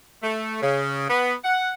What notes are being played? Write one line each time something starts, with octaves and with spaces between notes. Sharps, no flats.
A3
C#3
B3
F#5